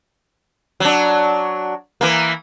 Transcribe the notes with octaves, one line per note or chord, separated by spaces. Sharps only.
F#3 D4
E3 A#3